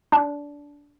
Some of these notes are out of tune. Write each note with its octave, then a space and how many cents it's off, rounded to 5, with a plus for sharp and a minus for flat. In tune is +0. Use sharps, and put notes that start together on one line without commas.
D4 -20